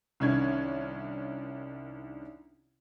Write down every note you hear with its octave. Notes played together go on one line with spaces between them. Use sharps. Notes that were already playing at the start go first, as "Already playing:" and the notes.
C2 D#3 C#4 D4 C#5 G#6